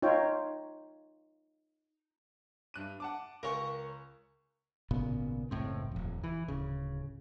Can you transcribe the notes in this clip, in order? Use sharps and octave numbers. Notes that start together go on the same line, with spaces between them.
D#4 F4 C#5 G5
G2 F#6 D#7
F#5 A5 D6
C#2 A#4 C#5 G#5 C#6
G#1 A#2 C#3 B3
F#1 C#2 A2 C4
D#1 F2
E3
D1 C#3